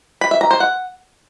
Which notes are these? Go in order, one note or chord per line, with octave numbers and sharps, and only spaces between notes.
B5
E5
A#5
C5
F#5